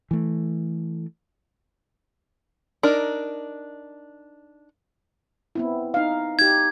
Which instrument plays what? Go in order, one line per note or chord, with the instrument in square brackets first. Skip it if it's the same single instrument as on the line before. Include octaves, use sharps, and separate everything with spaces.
[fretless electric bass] E3 A3
[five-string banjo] D4 D#4 A#4
[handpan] B3 C4 E4
D#4 F5
[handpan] D#4 G4 [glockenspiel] G#6